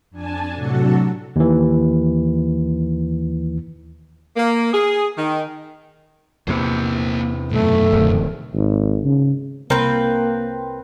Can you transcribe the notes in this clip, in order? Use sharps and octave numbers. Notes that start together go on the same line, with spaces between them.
F2 D4 G#5 A5
A2 C3 F#3 D4 F#4 A4
D#2 E3
A#3
G#4
D#3
E2 C3 A#3 C5
F#2 B2 A3
D1 D#3
G#1
C#3
C2 A#3 C4 A#4 B4 G6